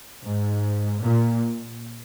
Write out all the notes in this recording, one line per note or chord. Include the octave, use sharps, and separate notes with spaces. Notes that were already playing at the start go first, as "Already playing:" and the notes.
G#2
A#2